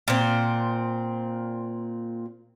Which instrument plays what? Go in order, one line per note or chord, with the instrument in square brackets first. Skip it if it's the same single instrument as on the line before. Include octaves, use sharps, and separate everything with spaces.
[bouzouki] A#2 C4